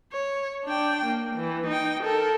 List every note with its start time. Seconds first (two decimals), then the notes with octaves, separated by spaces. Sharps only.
0.12 C#5
0.65 D4 G5
1.06 A#3
1.36 E3
1.68 D#4 G5
2.03 A4 A#4